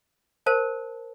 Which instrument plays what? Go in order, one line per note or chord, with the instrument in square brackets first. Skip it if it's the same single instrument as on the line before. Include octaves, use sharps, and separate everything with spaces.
[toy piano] A#4 C5 A5